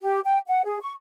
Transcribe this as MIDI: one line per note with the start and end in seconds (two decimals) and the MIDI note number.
0.01 0.19 67
0.25 0.38 79
0.47 0.65 78
0.65 0.78 68
0.81 0.92 85